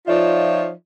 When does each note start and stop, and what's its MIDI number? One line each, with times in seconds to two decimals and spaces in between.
0.07 0.70 53
0.07 0.70 63
0.07 0.70 65
0.07 0.70 73
0.07 0.70 74
0.07 0.70 76